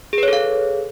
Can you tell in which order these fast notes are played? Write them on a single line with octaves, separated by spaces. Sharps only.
G#4 B4 C#5 A4 F5